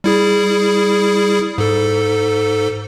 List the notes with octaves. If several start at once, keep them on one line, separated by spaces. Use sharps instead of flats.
G3 E4 G#4
G#2 A4